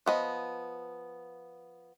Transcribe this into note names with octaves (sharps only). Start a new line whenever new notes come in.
F3 B3 D#5